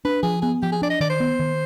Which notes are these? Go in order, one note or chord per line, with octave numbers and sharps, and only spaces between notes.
D4 B4
F3 G#4
B3 G#4
F3 G4
G#4
D4 D5
D#5
D#3 D5
C5
B3
D#3